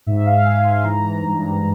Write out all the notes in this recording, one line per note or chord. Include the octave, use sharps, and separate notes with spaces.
G#2 E5
F5
G#2 G#5
C6
E3 A#5
G2